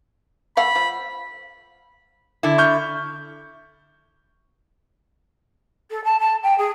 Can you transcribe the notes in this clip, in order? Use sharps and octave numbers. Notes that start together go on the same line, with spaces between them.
A3 F5 F#5 B5
F3
D3 E4
C#6 F6 G6
A4
A5
A5
G5
G#4